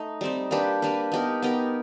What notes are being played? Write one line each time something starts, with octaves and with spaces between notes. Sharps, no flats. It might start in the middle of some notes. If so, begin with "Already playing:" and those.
Already playing: A3 D#4
G3 C4 D#4
A#3 D4 G4 B4
A#3 D4 G4 B4
B3 D#4 G4 A#4
B3 D#4 G4 A#4